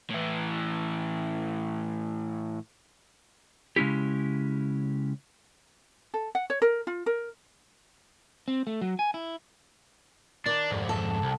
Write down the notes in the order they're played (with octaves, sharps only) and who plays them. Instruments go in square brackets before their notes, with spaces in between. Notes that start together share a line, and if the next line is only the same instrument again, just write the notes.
[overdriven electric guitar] A2 E3
[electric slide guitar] C#3 G#3 C#4 E4 G4
[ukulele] A4
F#5
C#5
A#4
F4
A#4
[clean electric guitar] C4
A3
F#3
G#5
E4
[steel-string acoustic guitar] D#3 D5 [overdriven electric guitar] D4
[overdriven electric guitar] F2 G#2
[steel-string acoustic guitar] A4
[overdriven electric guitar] C2